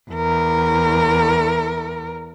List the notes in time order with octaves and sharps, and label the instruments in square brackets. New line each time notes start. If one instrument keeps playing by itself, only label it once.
[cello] E2 A#4